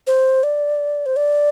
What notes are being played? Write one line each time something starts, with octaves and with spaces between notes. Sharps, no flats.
C5
D5
C5
D5